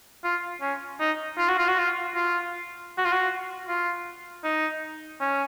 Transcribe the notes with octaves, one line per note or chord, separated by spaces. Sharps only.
F4
C#4
D#4
F4
F#4
F4
F#4
F4
F4
F#4
F4
F#4
F4
D#4
C#4